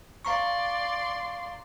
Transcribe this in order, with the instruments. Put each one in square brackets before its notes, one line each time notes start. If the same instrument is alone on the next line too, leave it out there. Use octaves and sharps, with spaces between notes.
[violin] D5 C6 [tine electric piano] F5 A#5 C#6